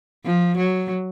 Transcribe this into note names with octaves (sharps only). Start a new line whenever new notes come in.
F3
F#3